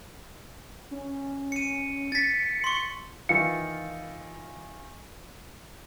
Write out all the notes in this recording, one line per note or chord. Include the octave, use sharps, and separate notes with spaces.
C#4
C#7 D#7
A6 B6 C#7
C6 C#6
D#3 E3 F4 C#7